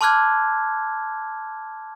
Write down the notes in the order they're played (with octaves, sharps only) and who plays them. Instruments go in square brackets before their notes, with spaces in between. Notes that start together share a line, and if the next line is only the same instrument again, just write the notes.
[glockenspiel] A5 C6 D6 F6 F#6 G#6